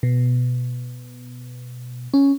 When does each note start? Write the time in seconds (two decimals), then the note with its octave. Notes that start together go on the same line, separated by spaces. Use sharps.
0.03 B2
2.14 C#4